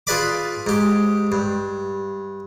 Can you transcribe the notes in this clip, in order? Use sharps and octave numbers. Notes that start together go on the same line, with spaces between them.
F4 G#4 B4 D5 B5 D6
G#2 G4
G2